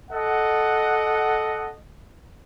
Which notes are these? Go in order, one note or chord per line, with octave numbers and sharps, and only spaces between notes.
A4 D#5 F#5